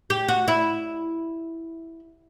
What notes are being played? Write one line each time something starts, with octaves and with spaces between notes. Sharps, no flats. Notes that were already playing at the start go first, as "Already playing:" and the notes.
G4
F#4
E4